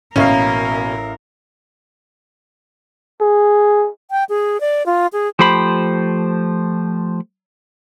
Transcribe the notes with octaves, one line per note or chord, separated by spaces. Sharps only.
A1 B2 A#3 C#4 A#4 E5 F5
G#4
G5
G#4
D5
F4
G#4
F3 A3 G4 C5 B5